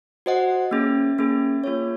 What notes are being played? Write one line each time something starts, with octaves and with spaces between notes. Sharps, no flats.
F#4 C5 D#5 F#5
A#3 C#4 G#4
A#3 C#4 G#4
A#3 F4 G#4 C#5